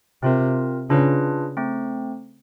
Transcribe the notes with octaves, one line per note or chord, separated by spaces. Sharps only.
C3 C4 F4 A#4
C#3 D4 F4 G#4 B4
A3 C4